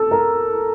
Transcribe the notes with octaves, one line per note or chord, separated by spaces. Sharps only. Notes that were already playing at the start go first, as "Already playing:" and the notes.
Already playing: A4
A#4